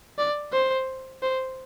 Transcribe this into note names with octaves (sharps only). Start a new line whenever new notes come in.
D5
C5
C5